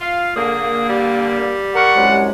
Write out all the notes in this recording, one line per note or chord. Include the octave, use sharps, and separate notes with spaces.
F4 F5
D3 A#3 G#4
G3
A#4 F#5 C#6
C2 F#2 G#3